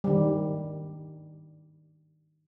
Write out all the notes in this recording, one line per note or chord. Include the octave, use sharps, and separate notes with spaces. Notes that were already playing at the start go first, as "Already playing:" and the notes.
D#3 G3